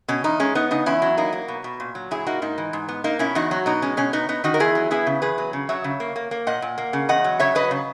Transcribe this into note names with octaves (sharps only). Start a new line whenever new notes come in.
B2 C#4
E2 D#4
G#3 C#4
B3 D#4
C#3 D#4
E2 C#4 E4
F#3
A#3 D#4
A#3
B2
B2
A#2
F#3
A#2 E4 G#4
A#3 D#4 F#4
G#2 D#4
E3
G#2
B3
A#3 D#4
B2 C#4 E4
E2 D#4 F#4
F#3
B2 D#4
G#3 C#4
B2 C#4
B3 D#4
B3 D#4
D#3 D#4 F#4
A#4
E2 E4 G#4
F#3
B3 E4 G#4
C#3
E2 G#4 B4
F#3
C#3
F#3 C#5 E5
C#3
A#3
A#3
A#3
A#2 D#5 F#5
A#2
A#3
C#3
E2 D#5 F#5
F#3
C#3 C#5 E5
F#3 B4 D#5
C#3